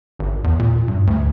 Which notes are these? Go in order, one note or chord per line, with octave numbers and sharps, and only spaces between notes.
G#1
E2
A#2
G2
D2